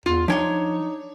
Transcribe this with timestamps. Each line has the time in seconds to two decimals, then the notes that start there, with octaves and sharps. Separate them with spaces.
0.06 E2 F4
0.28 F3 D4 D#4 C#5 G5 C6